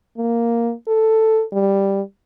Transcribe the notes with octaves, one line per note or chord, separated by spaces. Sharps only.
A#3
A4
G3